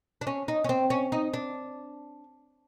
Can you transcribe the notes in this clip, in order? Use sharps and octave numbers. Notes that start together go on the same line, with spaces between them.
D4
C#4
D#4
C#4
C4
C#4
D#4
D4